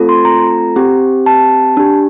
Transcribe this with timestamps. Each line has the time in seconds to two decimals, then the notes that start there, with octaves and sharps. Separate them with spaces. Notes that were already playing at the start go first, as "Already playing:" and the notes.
Already playing: A3 C4 F4 A4
0.09 C6
0.25 A#5
0.76 C4 G4
1.26 A5
1.77 D4 G4